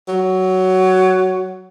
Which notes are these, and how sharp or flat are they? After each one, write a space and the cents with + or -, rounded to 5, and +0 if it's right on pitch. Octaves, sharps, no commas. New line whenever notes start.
F#3 +10